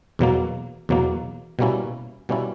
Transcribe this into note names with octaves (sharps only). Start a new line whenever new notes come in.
E2 B2 F#3 A#3
E2 B2 F#3 A#3
B2 G3 A#3 C#4 E4
B2 G3 A#3 C#4 E4